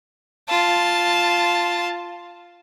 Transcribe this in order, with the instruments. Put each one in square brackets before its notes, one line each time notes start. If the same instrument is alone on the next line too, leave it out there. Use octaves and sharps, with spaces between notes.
[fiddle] F4 A5